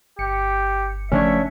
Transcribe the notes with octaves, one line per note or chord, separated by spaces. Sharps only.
G1 G4 C#7
C#3 F3 A3 C#4 D4 C#5 E5